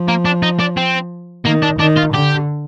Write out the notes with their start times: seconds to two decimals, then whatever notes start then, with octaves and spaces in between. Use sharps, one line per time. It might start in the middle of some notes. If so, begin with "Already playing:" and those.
Already playing: F3
0.08 A#3
0.25 D4
0.43 D#4
0.59 D4
0.77 C4
1.45 D#3 A#3
1.62 D4
1.79 D#3 D4
1.97 F4
2.13 D3 G4